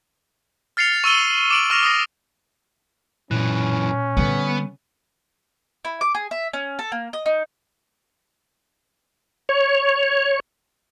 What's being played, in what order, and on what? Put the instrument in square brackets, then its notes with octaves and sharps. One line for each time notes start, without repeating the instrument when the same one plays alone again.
[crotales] F6 A6 C7 C#7 F7
C#6 E6 D#7 G7
D6 D7 F#7
C#6 F6 A#6 F7
D#6 A#6
[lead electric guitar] F#2 E3 [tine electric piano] A#2 F#6 [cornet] C#4
[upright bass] D3 G3 [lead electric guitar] B3
[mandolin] E4
D6
G#4
E5
C#4
A4
A#3
D#5
D#4
[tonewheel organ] C#5